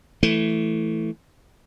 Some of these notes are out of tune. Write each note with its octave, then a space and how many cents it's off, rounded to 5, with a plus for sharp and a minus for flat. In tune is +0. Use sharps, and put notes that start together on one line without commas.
E3 +0 A3 +0